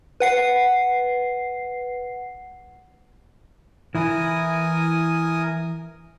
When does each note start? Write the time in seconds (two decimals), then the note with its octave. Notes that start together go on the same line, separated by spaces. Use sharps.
0.20 B4 F#5 C7
3.95 E3 E4 A#4 G#5 D#6